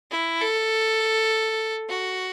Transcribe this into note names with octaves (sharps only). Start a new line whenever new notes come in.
E4
A4
F#4